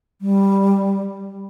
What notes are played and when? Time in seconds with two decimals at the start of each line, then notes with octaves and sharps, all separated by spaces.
0.21 G3